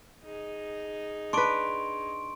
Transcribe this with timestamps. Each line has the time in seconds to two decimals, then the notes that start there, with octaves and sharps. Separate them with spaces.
0.24 D#4 G#4
1.33 D4 B4 C6 C#6 D7